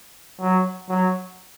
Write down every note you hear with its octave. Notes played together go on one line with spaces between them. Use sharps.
F#3
F#3